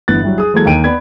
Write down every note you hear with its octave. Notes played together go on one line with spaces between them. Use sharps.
G1 E3 B3 F#6 A6
F#3 G3 E4
G#4 D#6
E3 F#3 G#3 A#3 A4 G#6
D#2 A#3 D#4 G5 D7 D#7
B3 D5 B5 G#6